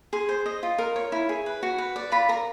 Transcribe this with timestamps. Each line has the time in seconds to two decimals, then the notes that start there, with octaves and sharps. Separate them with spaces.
0.13 G#4 C6
0.29 C5
0.46 D#5
0.63 F4
0.78 A#4
0.96 C#5
1.12 E4
1.29 G#4
1.46 B4
1.63 F#4
1.78 B4
1.96 D5
2.12 F4 B5
2.29 A#4 A#5